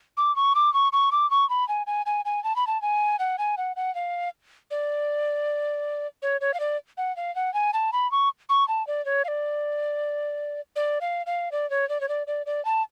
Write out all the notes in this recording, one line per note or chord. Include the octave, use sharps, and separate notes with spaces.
D6
C#6
D6
C#6
C#6
D6
C#6
B5
G#5
G#5
G#5
G#5
A5
B5
A5
G#5
F#5
G#5
F#5
F#5
F5
D5
C#5
C#5
F5
D5
F#5
F5
F#5
G#5
A5
B5
C#6
C#6
A5
D5
C#5
F5
D5
D5
F5
F5
D5
C#5
D5
C#5
D5
D5
D5
A5